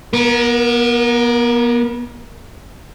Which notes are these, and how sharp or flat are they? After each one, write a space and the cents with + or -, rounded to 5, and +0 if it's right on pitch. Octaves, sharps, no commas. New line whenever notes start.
B3 -30 A#4 +15